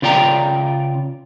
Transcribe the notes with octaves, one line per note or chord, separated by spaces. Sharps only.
C#3 F4 D5 G5 A#5